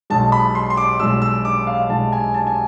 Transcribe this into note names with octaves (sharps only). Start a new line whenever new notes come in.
B1 B2 G#3 A5
B5
C6
C6
D6
B1 B2 G#3 E6
E6
D6
F5
B1 B2 G#3 A5
G#5
A5
G#5